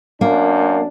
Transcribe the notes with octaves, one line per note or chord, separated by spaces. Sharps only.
F#2 A#3 D4